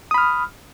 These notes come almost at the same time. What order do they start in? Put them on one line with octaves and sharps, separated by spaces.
D#6 B5 F6